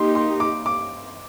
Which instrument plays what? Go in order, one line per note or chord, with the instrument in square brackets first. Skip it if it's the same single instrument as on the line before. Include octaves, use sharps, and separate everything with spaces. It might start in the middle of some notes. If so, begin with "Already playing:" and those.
Already playing: [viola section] A#3 D#4 G4 [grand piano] C6
[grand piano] C6
D6
D6